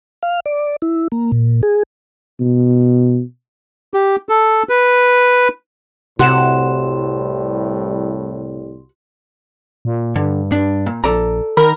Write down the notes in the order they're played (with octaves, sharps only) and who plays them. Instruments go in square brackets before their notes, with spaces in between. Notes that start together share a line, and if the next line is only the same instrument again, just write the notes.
[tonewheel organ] F5
D5
E4
A#3
A#2
G#4
[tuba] B2
[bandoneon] G4
A4
B4
[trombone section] C2 A2 G3 [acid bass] C3 [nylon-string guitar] F#4 F#5 [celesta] C6 E7
[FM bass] A#2
[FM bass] G2 [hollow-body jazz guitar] D3
[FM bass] G2 [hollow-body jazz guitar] D4
[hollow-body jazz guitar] A#2
[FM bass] A#1 [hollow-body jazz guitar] A4 D5 A#5
[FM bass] D#3 [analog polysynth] A#4 [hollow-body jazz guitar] B5